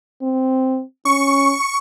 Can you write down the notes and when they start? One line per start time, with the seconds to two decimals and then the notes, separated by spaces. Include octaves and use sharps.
0.22 C4
1.05 C#4 C#6